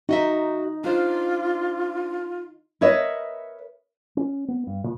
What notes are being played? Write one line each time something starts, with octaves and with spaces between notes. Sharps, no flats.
D#4 F#4 D#5 E5
D4 F4 C5
A#4 B4 C#5 D#5 E5
C#4
B3
G2
A#2